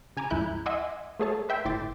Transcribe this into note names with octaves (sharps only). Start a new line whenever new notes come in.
C#3 G#5 A#5 B5 D6
D#2 G#2 F3 E4 F#6 G6
D#5 E5 F#5 G#5 C6 D6
A3 B3 G#4 A4 C#5 A5
B4 E5 G5 C6
G1 A2 C6 D6 A6